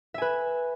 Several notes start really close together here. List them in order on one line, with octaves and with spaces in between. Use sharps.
E5 G#5 B4